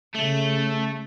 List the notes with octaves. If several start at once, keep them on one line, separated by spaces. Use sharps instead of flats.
C#3 A3